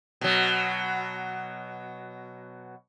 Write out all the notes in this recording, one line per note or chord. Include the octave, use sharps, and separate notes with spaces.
B2 F#3